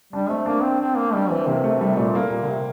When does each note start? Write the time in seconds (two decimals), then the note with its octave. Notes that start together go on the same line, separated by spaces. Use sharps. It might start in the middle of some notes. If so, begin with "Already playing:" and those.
0.13 G3 D4
0.29 A3 C4
0.46 A#3 D4
0.63 C4
0.80 C4
0.97 A#3
1.14 G3 D4
1.30 E3 C4
1.47 C3 A#3
1.64 C3 A3
1.81 C3 G3
1.97 A#2 A3
2.15 A#3
2.31 A#2
2.42 D3
2.48 C3